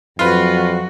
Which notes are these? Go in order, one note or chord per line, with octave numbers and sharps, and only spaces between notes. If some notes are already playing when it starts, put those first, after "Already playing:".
F2 F#3 F4 F#4 B4